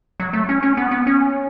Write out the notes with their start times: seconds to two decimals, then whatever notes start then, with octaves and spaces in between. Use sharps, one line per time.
0.20 F#3
0.33 A3
0.49 C#4
0.63 C#4
0.77 B3
0.91 B3
1.07 C#4